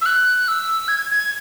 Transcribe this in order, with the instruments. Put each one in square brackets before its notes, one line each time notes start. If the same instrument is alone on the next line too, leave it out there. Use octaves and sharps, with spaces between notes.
[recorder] E6
F#6
E6
G#6
G#6